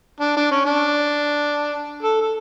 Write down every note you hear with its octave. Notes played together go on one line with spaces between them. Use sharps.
D4
D4
C#4
D4
A4
A4